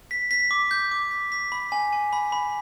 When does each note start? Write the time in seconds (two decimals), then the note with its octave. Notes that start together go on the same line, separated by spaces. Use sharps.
0.11 B6
0.31 B6
0.51 D6
0.71 G6
0.92 D6
1.11 B6
1.32 B6
1.52 B5
1.72 G#5
1.93 G#5
2.13 B5
2.32 B5